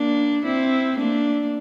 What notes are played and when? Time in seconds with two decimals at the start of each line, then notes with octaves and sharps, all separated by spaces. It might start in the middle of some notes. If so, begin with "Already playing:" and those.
Already playing: A#3 D4
0.45 C4 E4
0.98 A#3 D4